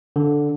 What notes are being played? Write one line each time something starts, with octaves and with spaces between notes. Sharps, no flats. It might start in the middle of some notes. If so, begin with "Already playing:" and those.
D3